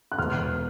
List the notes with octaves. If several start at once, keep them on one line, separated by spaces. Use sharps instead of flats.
F#6
E1 F6